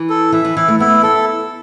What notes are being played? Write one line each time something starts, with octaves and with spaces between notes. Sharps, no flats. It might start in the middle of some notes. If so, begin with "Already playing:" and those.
Already playing: E3
A4
E3 E5
E3
E3 E4
A3
B3 E4
E4 A4